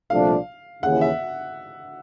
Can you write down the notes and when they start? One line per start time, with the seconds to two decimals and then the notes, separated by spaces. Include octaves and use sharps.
0.10 C2 A#2 F3 A3 D4 F5
0.83 D#2 C#3 E3 F#5
1.01 E5